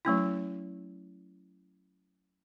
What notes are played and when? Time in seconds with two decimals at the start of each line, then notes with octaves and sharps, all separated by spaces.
0.05 F#3 A3 C#4 E4